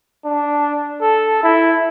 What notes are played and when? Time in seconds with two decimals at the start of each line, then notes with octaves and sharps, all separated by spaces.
0.25 D4
1.02 A4
1.43 E4